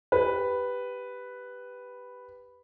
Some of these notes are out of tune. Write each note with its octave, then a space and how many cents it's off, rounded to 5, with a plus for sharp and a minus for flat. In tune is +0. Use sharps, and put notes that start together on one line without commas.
G4 +0 B4 +0